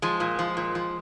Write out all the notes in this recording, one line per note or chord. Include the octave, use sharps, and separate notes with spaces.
F3 G#3
A#2
F3
A#2
F3